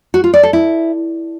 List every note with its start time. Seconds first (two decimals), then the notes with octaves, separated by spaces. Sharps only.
0.14 F#4
0.24 F4
0.34 D5
0.43 A4
0.53 E4